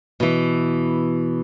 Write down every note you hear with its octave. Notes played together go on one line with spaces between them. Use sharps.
B2 E3